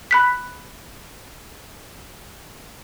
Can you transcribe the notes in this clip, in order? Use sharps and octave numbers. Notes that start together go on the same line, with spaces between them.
B5 F#6 B6